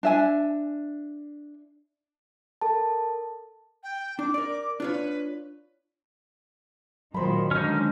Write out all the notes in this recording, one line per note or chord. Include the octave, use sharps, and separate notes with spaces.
D4 E5 G#5
A4 A#4 A5
G5
D4 D6
A#4 D5
D4 F4 B4 C#5
A#2 D#3 F#3 C5 B5
D3 D#3 G#3 C#4 D#4